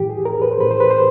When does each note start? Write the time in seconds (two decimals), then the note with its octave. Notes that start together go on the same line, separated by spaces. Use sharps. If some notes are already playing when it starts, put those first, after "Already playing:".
Already playing: A2 E3 G4
0.10 G#4
0.25 A#4
0.42 B4
0.51 C5
0.58 A2 E3 B4
0.71 C5
0.80 B4
0.90 C5